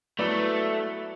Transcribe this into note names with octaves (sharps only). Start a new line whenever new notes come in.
F#3 A3 B3 E4 B4 D5